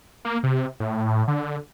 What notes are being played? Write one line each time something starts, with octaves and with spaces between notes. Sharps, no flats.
A#3
C3
A2
D3